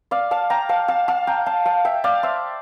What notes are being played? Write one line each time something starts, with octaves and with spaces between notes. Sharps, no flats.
D5 F5
F5 A5
G5 A#5
F5 A5
F5 A5
F5 A5
G5 A#5
F5 A5
F5 A5
E5 G5
D5 F5
C5 E5